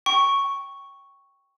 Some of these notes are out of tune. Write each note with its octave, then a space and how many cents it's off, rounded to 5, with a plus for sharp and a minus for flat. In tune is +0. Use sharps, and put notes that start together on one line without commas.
G5 +0 C#6 +0